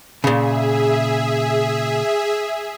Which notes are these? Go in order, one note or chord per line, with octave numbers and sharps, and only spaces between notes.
A#2 C#3 G#4 E5